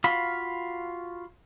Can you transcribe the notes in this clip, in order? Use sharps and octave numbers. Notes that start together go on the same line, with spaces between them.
F4 F#4 F5 B5